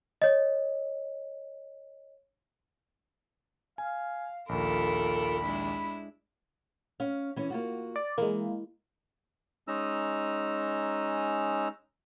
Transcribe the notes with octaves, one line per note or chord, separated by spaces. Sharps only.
C#5 D#5
F5 G#5
A#1 D#2 F4 A4 A#4 B5
G#3 D4 E4
C#4 F5
E3 C#4
A#3 F4 F#4
D5
E3 G#3 A#3
G#3 C#4 D#4 A#5 E6